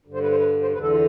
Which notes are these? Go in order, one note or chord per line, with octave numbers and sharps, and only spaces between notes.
G2 D3
C5
B4
C5
B4
C5
E2 D3 B4
A4
F4